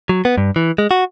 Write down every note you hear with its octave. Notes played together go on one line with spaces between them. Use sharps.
F#3
B3
G2
E3
G#3
F#4